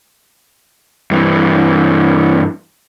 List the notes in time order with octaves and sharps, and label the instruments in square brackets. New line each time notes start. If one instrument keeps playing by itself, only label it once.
[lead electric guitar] G2 E3